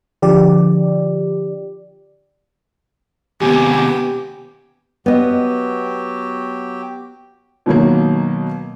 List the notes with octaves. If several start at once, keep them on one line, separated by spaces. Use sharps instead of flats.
D3 F3 G4 D5
D#2 C3 B3 G4 G#5
F#3 B3 G4 D#5
B2 D#3 F#3 A#3